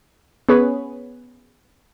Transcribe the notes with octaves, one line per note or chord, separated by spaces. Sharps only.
B3 C#4 G#4 B4 C#5